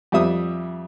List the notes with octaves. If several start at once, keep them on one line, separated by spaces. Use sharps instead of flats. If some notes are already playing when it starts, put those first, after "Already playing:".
F2 G3 E5 D#6